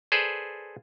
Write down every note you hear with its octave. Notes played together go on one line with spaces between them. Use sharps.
G#4 A4 B4 C5 D5